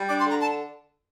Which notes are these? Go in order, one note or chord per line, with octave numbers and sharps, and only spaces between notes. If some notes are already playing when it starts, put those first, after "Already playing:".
Already playing: G3
D4 D6
C6
D3
A#5
A5